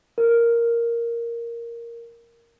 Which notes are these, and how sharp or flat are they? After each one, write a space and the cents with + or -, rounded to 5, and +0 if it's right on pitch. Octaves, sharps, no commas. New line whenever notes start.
A#4 +0